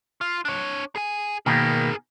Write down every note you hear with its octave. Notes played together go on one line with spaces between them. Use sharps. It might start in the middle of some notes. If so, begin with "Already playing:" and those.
F4
D4 C#5
G#4 G#5
B2 D#3 A#3 G#4 A#4